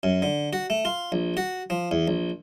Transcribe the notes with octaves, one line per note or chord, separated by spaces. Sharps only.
F#2
D3
F#4
A3
F4
A#1
F#4
F3
E2
A#1